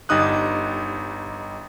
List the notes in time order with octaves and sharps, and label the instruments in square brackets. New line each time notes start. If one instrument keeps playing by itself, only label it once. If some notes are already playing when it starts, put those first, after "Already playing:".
[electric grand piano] G1 G3 D#4 D#6 F#6